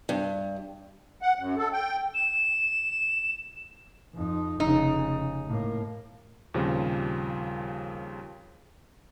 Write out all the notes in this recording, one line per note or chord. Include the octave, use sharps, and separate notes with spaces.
G2
F#5
F#2
A4
G5
E7
F2 D#4
F1 C#3 D#4
A2 A#3
D#2 A#2 C#3 F3 G3 C4